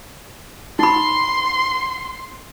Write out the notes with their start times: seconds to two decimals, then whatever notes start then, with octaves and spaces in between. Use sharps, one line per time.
0.79 D#4 B5 C6